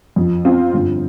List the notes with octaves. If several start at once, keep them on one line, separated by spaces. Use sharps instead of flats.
F2 F3
C4 F4
G1 F2 F3